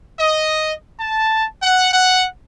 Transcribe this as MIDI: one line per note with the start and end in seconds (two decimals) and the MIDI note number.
0.19 0.74 75
1.00 1.46 81
1.63 1.90 78
1.94 2.26 78